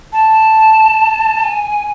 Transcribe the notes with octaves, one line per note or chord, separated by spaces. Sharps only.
A5
G#5